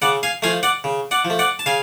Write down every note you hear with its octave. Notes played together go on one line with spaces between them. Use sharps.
C#3 D5 F#5
F5 G#5
F3 A3 F5 G#5
D5 F#5
C#3
D5 F#5
F3
A3
D5 F#5
A5
C#3 F5 G#5